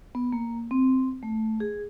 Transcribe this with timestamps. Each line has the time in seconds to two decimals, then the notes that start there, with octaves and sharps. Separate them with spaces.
0.15 B3
0.33 A#3
0.71 C4
1.23 A3
1.60 G#4